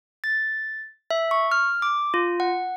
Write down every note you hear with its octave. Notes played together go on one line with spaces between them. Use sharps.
A6
E5
C#6
F6
D6
F4
F#5